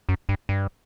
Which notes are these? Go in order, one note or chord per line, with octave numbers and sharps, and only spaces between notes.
F#2
G2
G2